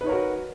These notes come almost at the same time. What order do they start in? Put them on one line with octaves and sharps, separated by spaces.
B4 D#4 C#5 A#4 F#4